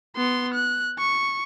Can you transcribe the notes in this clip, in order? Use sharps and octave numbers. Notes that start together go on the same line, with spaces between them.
B3 C6
F#6
C#6